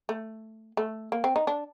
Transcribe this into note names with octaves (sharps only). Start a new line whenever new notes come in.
A3
A3
A#3
C4
D#4
D4